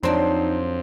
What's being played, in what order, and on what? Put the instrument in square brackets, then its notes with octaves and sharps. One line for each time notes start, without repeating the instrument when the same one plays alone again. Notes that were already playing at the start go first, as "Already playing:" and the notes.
[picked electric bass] F2 [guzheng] F#3 C4 D4 [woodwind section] D#4 [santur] C5